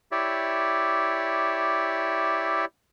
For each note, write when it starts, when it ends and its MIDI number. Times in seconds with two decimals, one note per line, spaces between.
0.12 2.65 64
0.12 2.65 67
0.12 2.65 73
0.12 2.65 74
0.12 2.65 76